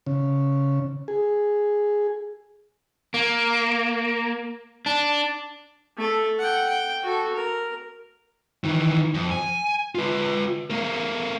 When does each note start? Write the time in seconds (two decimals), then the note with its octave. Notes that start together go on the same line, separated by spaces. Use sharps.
0.06 C#3
1.08 G#4
3.14 A#3
4.86 D4
5.97 A3 A4
6.39 F#5 G5
6.69 G5
7.03 F#4 A4
7.33 A#4
8.64 D#3 E3
9.15 F2
9.31 G#5
9.95 F4 B4
10.70 A3 A#4